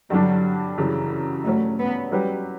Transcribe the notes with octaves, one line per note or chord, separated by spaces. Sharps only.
G2 D3 F#3 G3 D4
F#2 C#3 E3 G3
G2 F#3 A3 C#4
B3
F#3 G3 C#4 G4 B4